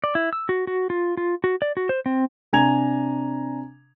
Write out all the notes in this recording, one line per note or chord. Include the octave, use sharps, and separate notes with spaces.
D5
E4
E6
F#4
F#4
F4
F4
F#4
D5
F#4
C5
C4
C3 D4 G#5 A#5 G#6 F7